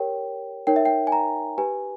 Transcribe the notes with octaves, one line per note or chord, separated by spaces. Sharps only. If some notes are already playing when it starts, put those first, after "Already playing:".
Already playing: G4 A#4 C#5 G5
D#4 A#4 C#5 G5
E5
G5
G#5
A#5
G4 B4 G#5